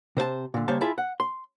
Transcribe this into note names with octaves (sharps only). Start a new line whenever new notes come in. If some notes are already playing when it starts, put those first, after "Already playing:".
C3 C5 E5 A5
A#2 D3
C#3 G3 A#3 C5 C#5 A5
E4 F4 G#4 E5 A5 B5
F#5
C6